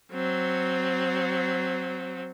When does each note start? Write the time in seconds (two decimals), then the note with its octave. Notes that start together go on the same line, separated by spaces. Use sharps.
0.13 F#3 C4